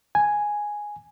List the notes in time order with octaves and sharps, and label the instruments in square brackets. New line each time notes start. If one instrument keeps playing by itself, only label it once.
[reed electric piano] G#5